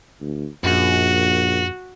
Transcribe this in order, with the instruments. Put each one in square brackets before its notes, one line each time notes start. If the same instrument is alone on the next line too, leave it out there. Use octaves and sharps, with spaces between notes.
[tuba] D2
[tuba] A#1 [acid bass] F#2 [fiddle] F#4